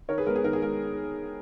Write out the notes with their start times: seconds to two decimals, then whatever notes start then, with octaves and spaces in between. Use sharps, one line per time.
0.09 D#3 A#4 C#5
0.18 G#4 B4
0.27 G#3 B3 A#4
0.36 G#4
0.44 D#3 A#4
0.53 G#4
0.62 G#3 B3 A#4